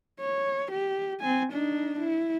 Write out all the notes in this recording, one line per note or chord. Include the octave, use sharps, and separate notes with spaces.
C#5
G4
C4 G#5
D4 D#4
E4